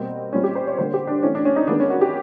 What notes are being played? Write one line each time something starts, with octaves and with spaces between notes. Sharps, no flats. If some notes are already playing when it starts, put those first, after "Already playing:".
Already playing: B2 G3 A#3 C4
A#2 G3 C4 C#4
G4
C5
C#5
D3 G3 A#3 C5
G4
D4
E3 A3 C4 C#4
D4
C#4
D#4
D#3 G#3 B3 D4
C#4
F#4
G4